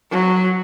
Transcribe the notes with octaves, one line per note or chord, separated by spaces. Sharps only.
F#3